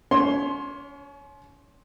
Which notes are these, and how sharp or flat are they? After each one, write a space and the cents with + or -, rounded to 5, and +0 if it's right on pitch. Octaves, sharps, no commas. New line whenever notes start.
C#4 +40 C#5 +0 C6 +15